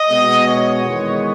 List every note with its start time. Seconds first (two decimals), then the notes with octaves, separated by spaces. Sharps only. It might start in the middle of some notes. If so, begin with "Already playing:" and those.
Already playing: D#5
0.10 B2 G#3 B3
0.46 C#5
0.84 E2 D#3 G#3 B3